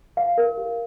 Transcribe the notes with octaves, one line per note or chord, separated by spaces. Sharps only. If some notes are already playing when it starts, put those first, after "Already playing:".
F5
A#4
G4